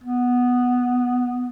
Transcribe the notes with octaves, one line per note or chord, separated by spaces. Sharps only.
B3